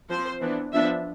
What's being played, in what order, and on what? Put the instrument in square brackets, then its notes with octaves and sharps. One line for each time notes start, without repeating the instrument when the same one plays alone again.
[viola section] F3 C4 C5
E3 B3 D4
F3 B3 D4 E5